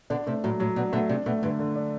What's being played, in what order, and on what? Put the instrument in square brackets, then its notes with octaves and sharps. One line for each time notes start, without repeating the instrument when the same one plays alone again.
[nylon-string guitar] B2 D3 [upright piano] D4
[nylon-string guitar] C3 [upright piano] A3
[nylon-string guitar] A2 [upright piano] F#3
[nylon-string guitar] A2 [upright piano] F#3
[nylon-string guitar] B2 [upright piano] D4
[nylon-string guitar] B2 D3 [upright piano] A3
[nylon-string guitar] C3 [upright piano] D4
[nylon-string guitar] B2 [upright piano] A3
[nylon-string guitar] G2 [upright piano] D3
[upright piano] D3
D4